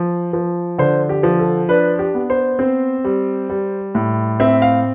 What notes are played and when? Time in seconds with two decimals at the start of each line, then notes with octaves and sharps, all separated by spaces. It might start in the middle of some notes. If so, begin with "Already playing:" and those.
Already playing: F3
0.33 F3
0.78 D3 C5
1.09 G4
1.23 F3
1.39 A4
1.69 D4 B4
1.99 G4
2.14 B3
2.30 C5
2.59 C4
3.04 G3
3.50 G3
3.95 A2
4.40 C4 E5
4.62 F5